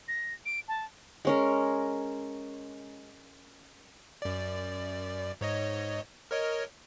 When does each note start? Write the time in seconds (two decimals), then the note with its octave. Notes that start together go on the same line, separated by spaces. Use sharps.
0.08 A#6
0.46 D7
0.68 A5
1.25 G#3 C#4 A#4
4.22 F#2 D5
5.41 G#2 C#5 D#5
6.31 A#4 C#5 D#5